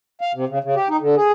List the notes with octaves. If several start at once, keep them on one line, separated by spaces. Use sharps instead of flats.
F5
C3
C#3
C#3
G4
D#4
D3
G#4